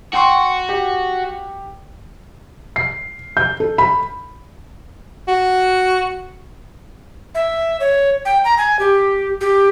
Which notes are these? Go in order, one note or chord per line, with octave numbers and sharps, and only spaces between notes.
F#4 G5 C6 C#6
G4
C7
G6
A4
B5
F#4
E5
C#5
G5
A#5
G#5
G4
G4